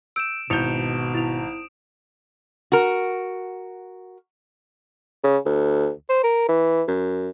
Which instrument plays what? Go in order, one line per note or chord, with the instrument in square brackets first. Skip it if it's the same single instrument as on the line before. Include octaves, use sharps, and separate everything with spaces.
[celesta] E6 G6 [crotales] D7 E7
[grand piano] G#1 G6 [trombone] B2 [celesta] E4 C#7 F7 [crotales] D#6
[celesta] E4 F7
[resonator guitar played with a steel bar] F#4 A#4
[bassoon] C#3
D2
C5
A#4
E3
F#2